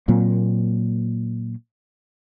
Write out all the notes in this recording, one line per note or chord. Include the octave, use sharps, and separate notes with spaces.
A#2 F#3 A#3 C4